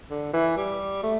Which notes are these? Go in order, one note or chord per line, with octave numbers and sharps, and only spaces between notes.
D3
E3
G3
A3